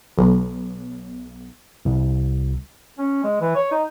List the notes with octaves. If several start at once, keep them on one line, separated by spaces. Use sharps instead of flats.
B1
C2
C#4
G#3
E3
C#5
D#4